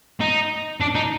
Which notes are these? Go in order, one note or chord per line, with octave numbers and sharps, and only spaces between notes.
D#4
D4
D#4